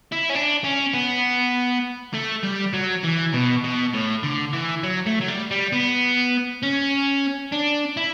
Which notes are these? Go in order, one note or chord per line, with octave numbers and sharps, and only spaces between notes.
E4
C#4
D4
C#4
B3
A3
G3
F#3
E3
B2
B2
A2
D3
E3
F#3
A3
F#3
G3
G3
B3
C#4
D4
E4